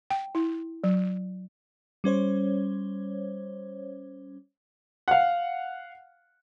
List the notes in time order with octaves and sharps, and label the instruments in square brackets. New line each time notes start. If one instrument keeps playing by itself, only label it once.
[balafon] G5
E4
F#3
[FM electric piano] G3 C#4 C5 C#5
[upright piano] F5 F#5